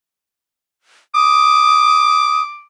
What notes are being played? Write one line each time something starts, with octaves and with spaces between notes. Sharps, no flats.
D6 D#6